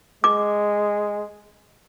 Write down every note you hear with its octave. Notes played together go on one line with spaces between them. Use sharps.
G#3 D6